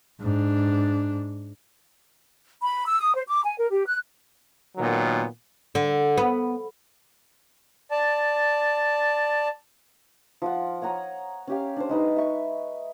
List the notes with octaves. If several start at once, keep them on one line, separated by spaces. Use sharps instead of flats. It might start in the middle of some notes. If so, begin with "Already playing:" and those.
G#2 D4
B5
E6
D#6
C5
D6
G#5
A#4
G4
F#6
A#2 D#3 F#3 B3
D3
B3
D5 A5
F3 F4 F#5
C#5 F#5 A#5 D#6
C#4 G4 F5
D4 C5
G#3 D#4 B4
E5 C#6